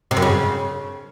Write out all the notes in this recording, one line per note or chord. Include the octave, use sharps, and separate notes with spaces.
C3
F#2
C#3